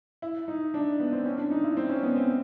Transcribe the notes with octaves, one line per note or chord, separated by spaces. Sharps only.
E4
D#4
D4
B3
C4
C#4
D4
D#4
E4
C4
C#4
B3
C4